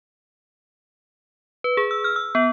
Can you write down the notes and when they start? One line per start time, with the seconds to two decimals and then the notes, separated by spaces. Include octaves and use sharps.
1.64 B4
1.77 G#4
1.91 E6
2.04 F6
2.16 E6
2.35 B3